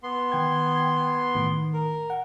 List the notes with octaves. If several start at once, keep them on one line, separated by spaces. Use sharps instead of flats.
B3 C6
D#3 G5 G#6
A2 D#3
A#4
F#5